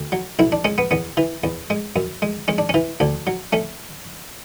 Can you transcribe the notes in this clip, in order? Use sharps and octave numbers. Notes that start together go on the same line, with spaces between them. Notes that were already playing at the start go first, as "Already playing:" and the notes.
Already playing: D2
F#3
B1 E4
D4
G#3 C#4
B3
E2 B3
E3
E2
G#3
F#2
G#3
G#3 C#4
D4
E3 C#4
D2 D4
F#3
A3 C#4